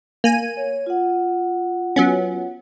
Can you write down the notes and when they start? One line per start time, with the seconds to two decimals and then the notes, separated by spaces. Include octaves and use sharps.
0.24 A#3 G#5 D#7
0.57 C#5
0.86 F4 F#5
1.96 F#3 B3 C#4